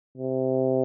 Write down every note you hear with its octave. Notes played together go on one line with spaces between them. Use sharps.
C3